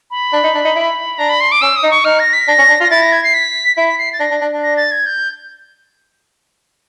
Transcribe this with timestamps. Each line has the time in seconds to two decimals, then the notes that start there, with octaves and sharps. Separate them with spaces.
0.11 B5
0.33 D4
0.44 D#4
0.55 D4
0.65 D#4
0.76 E4
1.18 D4 A#5
1.29 B5
1.41 C6
1.52 D6
1.61 C#4 E6
1.76 D#6
1.83 D#4
1.91 C#6
2.05 D#4 F6
2.19 A#6
2.33 B6
2.48 D4 A#6
2.59 C#4
2.69 D4
2.80 F4
2.83 A#6
2.91 E4 A6
3.02 A#6
3.12 G#6
3.24 C7
3.34 B6
3.77 E4 B6
3.88 B6
3.98 C7
4.13 A6
4.19 D4 A#6
4.31 D4
4.41 D4
4.52 D4
4.63 A#6
4.77 A6
4.91 G#6
5.06 G6